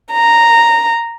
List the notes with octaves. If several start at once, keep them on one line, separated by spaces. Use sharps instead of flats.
A#5